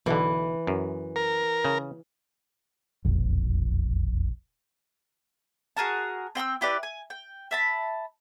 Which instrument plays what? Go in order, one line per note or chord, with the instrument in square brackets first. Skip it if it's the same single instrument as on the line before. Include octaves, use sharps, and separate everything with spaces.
[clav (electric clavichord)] B1 D3 [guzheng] E3
[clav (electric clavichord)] F#2
[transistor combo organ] A#4
[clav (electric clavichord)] C#3
[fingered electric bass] E1 A#1 F2
[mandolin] F#4 G#4 A#4 A5
C4 G5 C6 E6
E4 G4 B4 D5
G#5
G5
E5 A5 B5